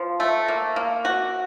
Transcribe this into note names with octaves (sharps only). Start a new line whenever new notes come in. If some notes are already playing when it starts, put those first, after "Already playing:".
Already playing: F3
A3
A#3
A#3
F#4